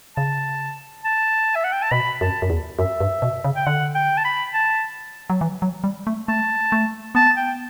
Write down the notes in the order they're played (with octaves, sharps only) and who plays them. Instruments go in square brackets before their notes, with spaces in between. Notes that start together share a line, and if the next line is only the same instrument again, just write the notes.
[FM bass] C#3 [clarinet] A5
[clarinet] A5
E5
F#5
G5
A5
[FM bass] B2 [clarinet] B5
[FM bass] F#2 [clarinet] A5
[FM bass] F#2
E2
[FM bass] F#2 [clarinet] E5
[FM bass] G2
B2
C#3
[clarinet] G5
[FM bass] D3 [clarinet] F#5
[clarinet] G5
A5
B5
A5
[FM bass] F#3
E3
F#3
G3
A3
[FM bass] A3 [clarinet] A5
[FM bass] A3
[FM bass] B3 [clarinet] A5
[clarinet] G5